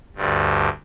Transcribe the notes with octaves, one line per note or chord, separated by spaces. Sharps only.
D2 G2